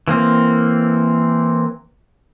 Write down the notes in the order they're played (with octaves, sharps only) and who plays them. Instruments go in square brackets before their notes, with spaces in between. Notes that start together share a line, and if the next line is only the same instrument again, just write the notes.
[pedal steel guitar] E3 A#3 C4